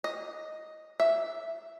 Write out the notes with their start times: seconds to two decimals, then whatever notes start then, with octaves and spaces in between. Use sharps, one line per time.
0.04 D#5
1.00 E5